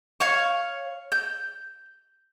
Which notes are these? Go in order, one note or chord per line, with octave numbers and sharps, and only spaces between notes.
C#5 F5 C#6
G6